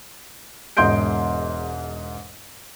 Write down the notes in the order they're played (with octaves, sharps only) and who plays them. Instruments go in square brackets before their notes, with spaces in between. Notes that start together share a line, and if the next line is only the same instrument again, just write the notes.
[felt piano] E1 G#2 D#5 C6 G6 D7